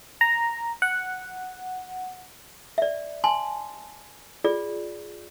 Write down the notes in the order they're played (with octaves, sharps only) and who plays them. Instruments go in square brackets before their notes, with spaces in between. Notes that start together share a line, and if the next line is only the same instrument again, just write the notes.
[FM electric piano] A#5
F#5
[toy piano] D5 E5
G#5 A5 C6
F4 G#4 D5